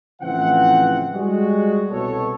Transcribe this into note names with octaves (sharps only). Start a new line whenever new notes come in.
A2 C#3 E3 F3 C4 F#5
G3 G#3 F#4
C2 B2 A4 C#5